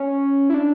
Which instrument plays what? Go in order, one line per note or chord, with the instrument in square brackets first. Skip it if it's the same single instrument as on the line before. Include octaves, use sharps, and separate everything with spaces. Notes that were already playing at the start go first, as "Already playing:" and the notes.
Already playing: [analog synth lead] C#4
E4
D4